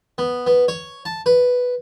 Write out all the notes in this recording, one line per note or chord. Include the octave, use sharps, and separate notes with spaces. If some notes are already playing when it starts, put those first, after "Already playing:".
B3
B3
C#5
A5
B4